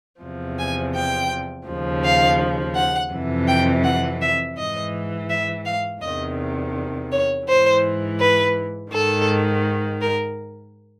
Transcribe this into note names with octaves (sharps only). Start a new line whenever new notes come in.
E2 C3 F3
G#5
G5
D#2 C#3 F3
F5
F#5
F2 C3 E3
G5
F#5
E5
G#2 E3 D#5
E5
F5
E2 C3 D#3 D#5
C#5
G#2 E3 C5
B4
G#2 D#3 A4
A#4